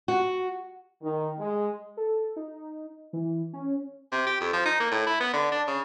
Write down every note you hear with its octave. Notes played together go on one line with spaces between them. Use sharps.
F#4
D#3
G#3
A4
D#4
E3
C#4
C3
G4
F2
F3
D#4
A#3
A2
E4
B3
D3
D4
C#3